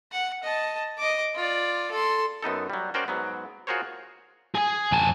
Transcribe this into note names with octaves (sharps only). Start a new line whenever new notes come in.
F#5
D#5 A5
D#5 D6
F4 D5
A4 C6
F#2 B3 D#4 A4
F#3 G3
C#4 F#4 A#4 C5 D5 G5
G#2 F#3 B3
F4 F#4 G#4 A#4 C5 C#5
G#4 G#5
F2 G#5 A5